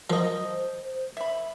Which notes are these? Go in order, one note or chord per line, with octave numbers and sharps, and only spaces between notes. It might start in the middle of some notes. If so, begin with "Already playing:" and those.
F3 A#4 C5 D#5
E5 B5